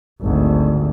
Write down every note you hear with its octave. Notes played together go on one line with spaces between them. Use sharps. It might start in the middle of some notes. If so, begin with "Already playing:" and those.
G#1 D2